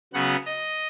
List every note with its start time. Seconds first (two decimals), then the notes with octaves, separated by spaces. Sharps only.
0.13 C#3 F#3 B3 F#5
0.46 D#5